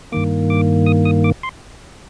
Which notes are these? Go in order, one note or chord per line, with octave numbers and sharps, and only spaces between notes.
G2 D#3 A#3 D6
D6
D#6
D#6
D6
C6